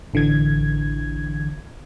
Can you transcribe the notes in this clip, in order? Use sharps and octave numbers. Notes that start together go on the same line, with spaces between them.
A1 D3 E3 G#6